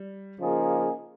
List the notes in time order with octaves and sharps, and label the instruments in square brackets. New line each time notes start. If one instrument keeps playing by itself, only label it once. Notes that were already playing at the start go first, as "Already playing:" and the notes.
Already playing: [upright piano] G3
[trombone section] C#3 F3 A#3 D#4 G#4